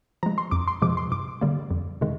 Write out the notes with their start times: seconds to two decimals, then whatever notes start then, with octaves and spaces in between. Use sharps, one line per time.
0.23 F3 G#3 A#5
0.38 C6
0.51 F2 D6
0.68 C6
0.82 C3 F3 G#3 D6
0.97 C6
1.11 G2 D6
1.41 D3 G3 A#3
1.71 F2
2.01 C3 D#3 G#3